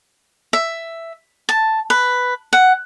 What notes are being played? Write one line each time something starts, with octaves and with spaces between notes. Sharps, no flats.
E5
A5
B4
F#5